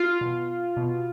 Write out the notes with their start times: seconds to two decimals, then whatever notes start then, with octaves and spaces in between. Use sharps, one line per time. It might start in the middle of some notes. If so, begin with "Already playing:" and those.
Already playing: F4
0.21 B2
0.77 B2